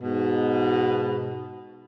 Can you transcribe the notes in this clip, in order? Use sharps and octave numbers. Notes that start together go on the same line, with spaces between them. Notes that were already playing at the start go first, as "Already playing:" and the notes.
G#2 B2